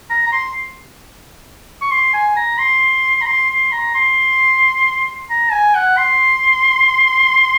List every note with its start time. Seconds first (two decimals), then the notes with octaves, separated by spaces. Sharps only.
0.10 A#5
0.26 A#5
0.32 C6
1.81 C#6
1.91 C6
2.13 G#5
2.36 A#5
2.58 C6
3.21 A#5
3.26 C6
3.49 C6
3.72 A#5
3.94 C6
5.30 A#5
5.52 G#5
5.75 F#5
5.97 C6